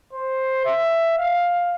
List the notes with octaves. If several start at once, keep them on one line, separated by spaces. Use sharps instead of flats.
C5
E5
F5